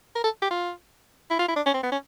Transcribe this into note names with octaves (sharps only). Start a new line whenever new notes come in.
A#4
A4
G4
F4
E4
F4
E4
D4
C#4
C4
B3
C#4